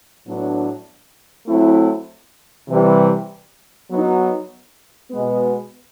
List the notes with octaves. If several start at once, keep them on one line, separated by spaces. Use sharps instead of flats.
A2 F#3 B3 D4
F#3 A3 C4 E4
C3 E3 G3
F#3 B3 D#4
B2 G#3 B3